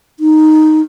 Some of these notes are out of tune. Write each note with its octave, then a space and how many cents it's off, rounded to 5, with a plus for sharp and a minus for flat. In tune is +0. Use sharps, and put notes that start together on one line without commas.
D#4 +0